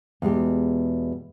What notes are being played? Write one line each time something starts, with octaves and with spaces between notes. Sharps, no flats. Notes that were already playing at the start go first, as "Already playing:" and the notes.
E2 B2 G#3 G4